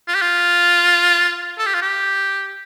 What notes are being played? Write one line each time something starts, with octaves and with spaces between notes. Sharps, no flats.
F4
G4
F4
A4
G4
F4
G4